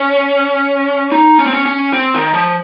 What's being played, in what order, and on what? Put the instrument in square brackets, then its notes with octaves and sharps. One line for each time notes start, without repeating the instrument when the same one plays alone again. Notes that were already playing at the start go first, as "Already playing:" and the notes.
Already playing: [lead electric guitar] C#4
D#4
C#4
C4
C#4
C#4
C4
D#3
F3